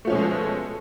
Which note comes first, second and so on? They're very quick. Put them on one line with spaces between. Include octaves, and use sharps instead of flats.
A3 F3 C#4 B2 G#3